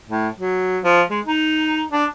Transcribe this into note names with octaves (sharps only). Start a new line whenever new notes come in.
A2
F#3
F3
G#3
D#4
D4